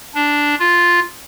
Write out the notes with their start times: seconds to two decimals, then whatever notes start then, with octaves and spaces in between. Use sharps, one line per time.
0.15 D4
0.60 F4